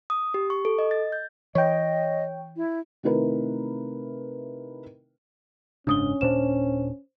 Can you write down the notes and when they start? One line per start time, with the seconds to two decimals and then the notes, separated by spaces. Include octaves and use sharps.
0.10 D#6
0.34 G4
0.50 C#6
0.65 A4
0.78 D#5
0.91 A6
1.12 G6
1.55 E3 C#5 D#5 G5
2.56 E4
3.03 C3 D#3 A3 E4 A#4 B4
5.87 F#1 G#2 C#3 C#4 D4 D#6 G7
6.21 D#1 A#2 D4 C5 E7